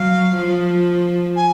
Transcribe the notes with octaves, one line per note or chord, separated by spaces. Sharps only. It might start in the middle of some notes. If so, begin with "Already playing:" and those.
Already playing: F#3 F5
F3
G#5